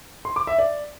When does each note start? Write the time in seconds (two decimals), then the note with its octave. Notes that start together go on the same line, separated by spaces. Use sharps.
0.25 C6
0.36 D6
0.47 E5
0.59 D5